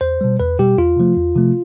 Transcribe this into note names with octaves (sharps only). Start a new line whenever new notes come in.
E2 C5
B2 G3
E2 B4
B2 G3 G4
E2 F4
C3 F3 A3
E2
C3 F3 A3